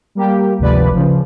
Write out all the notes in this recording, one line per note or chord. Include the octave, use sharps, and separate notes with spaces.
G3 A#3 G4
G#1 D2 C3 F3 B4 D5
C#3 F3